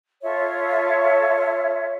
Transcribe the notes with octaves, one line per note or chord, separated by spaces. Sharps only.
F4 A4 C#5 E5